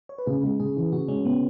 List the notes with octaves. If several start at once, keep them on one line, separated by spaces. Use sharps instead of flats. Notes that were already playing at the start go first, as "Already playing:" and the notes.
C#5
B4
C#3 G#4
G#3
C#3 G#4
E3
C#3 F#4
G#3 C#4
C#3 B3